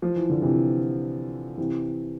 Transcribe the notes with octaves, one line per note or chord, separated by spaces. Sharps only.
F3
E3
D3
C3 E3
C3 E3